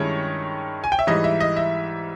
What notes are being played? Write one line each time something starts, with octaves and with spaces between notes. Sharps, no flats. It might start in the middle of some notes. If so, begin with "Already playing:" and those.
Already playing: G2 D#3 G#3 C#4 E4 C#5
G#5
G5
E5
G#2 E3 G3 D#5
E5
D#5
E5